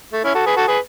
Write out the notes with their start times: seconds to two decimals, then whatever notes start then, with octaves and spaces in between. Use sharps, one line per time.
0.13 A3
0.24 C#4 E4
0.35 F#4 A4
0.46 G#4 B4
0.57 F#4 A4
0.68 G#4 B4